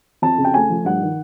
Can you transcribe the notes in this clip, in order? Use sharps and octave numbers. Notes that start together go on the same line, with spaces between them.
F2 A5
C#3
G5
A3 G#5
F3
G2 F#5
D#3